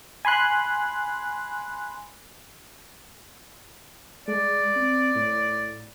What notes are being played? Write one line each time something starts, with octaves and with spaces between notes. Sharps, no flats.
G#5 B5 C6 F#6
G#3 D5
C4
A2